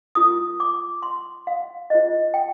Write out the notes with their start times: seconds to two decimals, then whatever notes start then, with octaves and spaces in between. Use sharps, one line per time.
0.15 F4 A#4 D#6
0.60 D6
1.03 C6
1.47 F5
1.90 F4 G#4 C5 D#5
2.34 G5